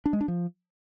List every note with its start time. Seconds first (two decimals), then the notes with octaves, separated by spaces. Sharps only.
0.06 D4
0.13 G#3
0.21 D4
0.28 F3